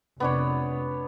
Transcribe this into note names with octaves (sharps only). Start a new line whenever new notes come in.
F1 B3 D4 C#5